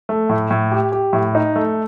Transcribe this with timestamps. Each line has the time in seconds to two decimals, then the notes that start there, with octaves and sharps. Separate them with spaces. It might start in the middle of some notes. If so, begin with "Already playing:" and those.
0.09 A3
0.29 A2
0.50 A2
0.72 G4
0.92 G4
1.13 A2
1.35 D#4
1.56 A3